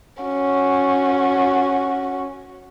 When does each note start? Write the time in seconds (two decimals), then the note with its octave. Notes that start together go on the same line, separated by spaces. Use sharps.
0.22 C#4 F#4